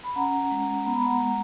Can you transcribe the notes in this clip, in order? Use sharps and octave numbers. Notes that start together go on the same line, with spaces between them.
B5
C#4 F#5 A#5
G#3
B3 A#5
B5
F#5 A#5
G#3